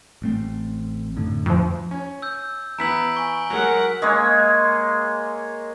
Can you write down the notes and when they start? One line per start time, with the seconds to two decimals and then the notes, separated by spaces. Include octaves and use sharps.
0.22 A1 A3 C4
1.16 F#2 A2 D3
1.46 F2 F3
1.91 C#4
2.22 E6 G6
2.79 E3 B3 A#5 E6 B6 D7
3.16 G#5 C#6
3.50 F#3 G#3 A#4 F#5
4.02 G#3 A#3 C#5 G#5